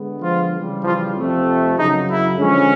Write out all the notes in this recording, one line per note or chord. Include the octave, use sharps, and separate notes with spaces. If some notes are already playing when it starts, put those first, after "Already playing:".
Already playing: D3 G#3 B3
F3 F4
C#3 E3 G3
F3 F4
F2 C3 F3 A3 C4
F#2 C#3 F#3 D#4
E4
D3 F3 G#3 C#4